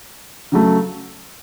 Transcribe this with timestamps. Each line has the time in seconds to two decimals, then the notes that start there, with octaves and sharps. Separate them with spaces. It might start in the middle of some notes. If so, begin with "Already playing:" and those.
0.52 C#3 F#3 A3